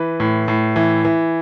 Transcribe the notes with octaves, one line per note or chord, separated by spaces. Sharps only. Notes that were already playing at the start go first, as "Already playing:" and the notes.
Already playing: E3 B4
A2
A2
E3
E3